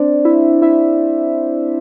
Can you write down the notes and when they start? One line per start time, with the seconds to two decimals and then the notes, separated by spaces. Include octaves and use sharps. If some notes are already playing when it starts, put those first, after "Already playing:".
Already playing: C4 D4 C5 D5
0.25 E4 E5
0.62 E4 E5